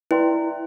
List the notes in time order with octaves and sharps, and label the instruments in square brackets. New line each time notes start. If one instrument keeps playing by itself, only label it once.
[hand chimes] E4 [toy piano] B4 D5 G5 C6